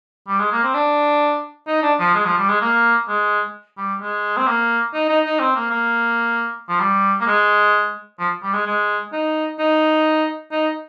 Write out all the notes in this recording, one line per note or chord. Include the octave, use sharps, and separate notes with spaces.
G3
G#3
A#3
C4
D4
D#4
D4
F3
G#3
F3
G3
G#3
A#3
G#3
G3
G#3
C4
A#3
D#4
D#4
D#4
C4
A#3
A#3
F3
G3
A#3
G#3
F3
G3
G#3
G#3
D#4
D#4
D#4